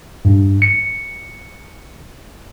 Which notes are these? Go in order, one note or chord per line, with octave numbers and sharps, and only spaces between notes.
G2
C#7